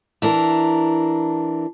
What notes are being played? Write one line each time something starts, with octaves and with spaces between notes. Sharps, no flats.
E3 D4 A#4